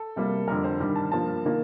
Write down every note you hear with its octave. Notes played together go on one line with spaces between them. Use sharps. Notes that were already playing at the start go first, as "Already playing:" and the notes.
Already playing: A4
C3 G3 A#3
F2 D3 G3 A#4
C5
G2 D#3 G3
A5
G2 F3 A#3 A5
D#3 A#3